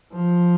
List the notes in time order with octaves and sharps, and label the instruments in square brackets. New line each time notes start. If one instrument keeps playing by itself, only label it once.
[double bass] F3